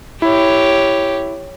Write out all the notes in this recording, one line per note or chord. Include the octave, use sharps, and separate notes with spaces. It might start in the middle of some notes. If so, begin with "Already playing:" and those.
E4 G4 C#5